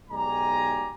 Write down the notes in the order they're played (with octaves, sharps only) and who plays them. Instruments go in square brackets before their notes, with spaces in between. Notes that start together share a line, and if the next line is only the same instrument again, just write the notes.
[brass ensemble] B1 G#3 G4 D5 G#5 A#5